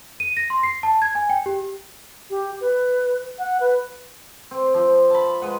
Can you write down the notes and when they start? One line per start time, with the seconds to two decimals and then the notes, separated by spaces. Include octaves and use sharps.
0.20 D#7
0.37 A#6
0.50 C6
0.63 C7
0.83 A5
1.02 G#6
1.15 G#5
1.30 G5
1.46 G4
2.30 G4
2.61 B4
3.39 F#5
3.60 B4
4.51 C4
4.74 F3
5.10 A5 B5
5.42 G#3 B4 F#5